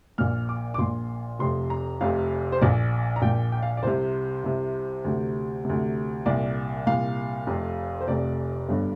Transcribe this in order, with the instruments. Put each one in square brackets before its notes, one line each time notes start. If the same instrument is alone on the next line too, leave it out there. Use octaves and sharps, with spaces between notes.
[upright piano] A#1 A#2 F6
D6
D6
A#1 A#2 C6
F1 F2 C3 C6
A#5
F1 F2 C3 F5
C5
A#1 A#2 D5
A#5
A#1 A#2 G5
G5
F5
D5
C2 C3 C5
C2 C3
D2 C3
D2 C3
C2 A#2 D5
C2 A#2 F5
F1 F2 C3
C5
F1 F2 C3 D5
G1 G2 D3